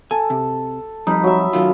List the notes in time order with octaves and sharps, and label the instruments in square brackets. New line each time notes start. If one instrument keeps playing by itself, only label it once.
[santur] A4 [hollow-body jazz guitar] G#5
[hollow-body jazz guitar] C3
[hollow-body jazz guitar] F2 G3 [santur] D#4 B5
[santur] F#3 E5
[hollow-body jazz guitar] F#2 D#3 F4